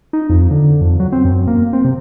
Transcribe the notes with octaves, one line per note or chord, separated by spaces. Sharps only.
D#4
F2
D3
F2
F#3
C4
F#2
A#3
C4
C3